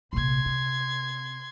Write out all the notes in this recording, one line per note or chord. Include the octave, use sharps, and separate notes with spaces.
A#1 C3 C6 G#6
C3